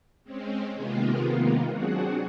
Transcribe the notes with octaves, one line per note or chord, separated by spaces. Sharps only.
G#3 C4 C#4
C3 D#3 G#3 A#3 B3 F4
F#3 C4 D4 F#4 G#4 F#5